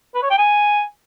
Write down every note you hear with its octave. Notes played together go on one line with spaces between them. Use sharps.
B4
C#5
G5
G#5